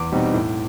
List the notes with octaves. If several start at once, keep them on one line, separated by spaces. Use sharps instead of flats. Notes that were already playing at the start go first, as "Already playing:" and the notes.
Already playing: E2 D6
B2 G3 C4 D#4
A2